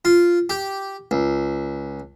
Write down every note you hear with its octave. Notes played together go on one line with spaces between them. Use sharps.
F4
G4
C#2